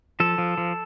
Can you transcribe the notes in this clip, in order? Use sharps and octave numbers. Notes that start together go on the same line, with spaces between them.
F3 A4
F3
F3